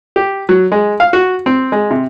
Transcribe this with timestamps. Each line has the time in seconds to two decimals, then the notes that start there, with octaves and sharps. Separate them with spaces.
0.16 G4
0.49 F#3
0.72 G#3
1.00 F5
1.13 F#4
1.46 C4
1.72 G#3
1.91 C3